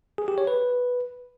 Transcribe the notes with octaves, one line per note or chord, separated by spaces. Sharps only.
G#4
G4
C#5
B4